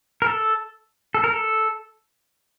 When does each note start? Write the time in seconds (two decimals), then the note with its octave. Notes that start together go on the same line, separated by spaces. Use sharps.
0.22 A#4
0.27 A4
1.14 A4
1.24 A#4
1.33 A4